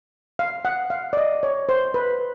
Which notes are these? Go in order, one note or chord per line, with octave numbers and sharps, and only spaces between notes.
F5
F#5
F5
D5
D#5
C#5
C5
B4